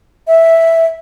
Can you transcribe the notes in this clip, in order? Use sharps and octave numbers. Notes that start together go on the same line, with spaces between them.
E5